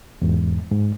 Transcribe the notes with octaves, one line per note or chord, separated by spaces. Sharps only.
E2 G#2
G#2